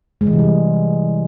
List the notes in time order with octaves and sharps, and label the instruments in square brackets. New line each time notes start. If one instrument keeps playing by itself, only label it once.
[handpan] G#3
E3
C3
G3